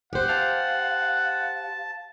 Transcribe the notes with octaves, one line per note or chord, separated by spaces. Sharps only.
G4 C5 F#5
F5 A5